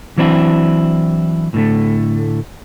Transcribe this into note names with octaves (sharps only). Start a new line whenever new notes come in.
E3 F#3 C4 D4 E4
A2 D3 A3